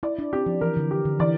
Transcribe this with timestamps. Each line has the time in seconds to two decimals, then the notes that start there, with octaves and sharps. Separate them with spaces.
0.03 E4 D5
0.19 D4
0.33 C4 G4
0.46 F3
0.61 E3 A#4
0.77 D3
0.91 G4
1.05 D3
1.20 E3 D5